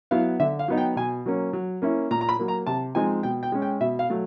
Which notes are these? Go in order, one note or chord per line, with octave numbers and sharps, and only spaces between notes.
F#3 B3 E4 F5
D3 E5
F5
F#3 B3 D#4
G5
B2 G#5
F#3 A#3 C#4
F#3
A#3 C#4 E4
A#2 A#5
A#5
B5
F#3 A#3
A#5
C3 A5
F3 G#3 C4 D#4 G#5
B2 G5
G5
G#3 C#4
G5
B2 E5
F5
F#3 A3